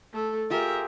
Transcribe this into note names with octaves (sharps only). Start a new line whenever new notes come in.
A3 A4
F4 G4 G#4 A#4 E5